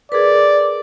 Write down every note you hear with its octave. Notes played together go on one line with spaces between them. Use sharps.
G#4 A#4 B4 D5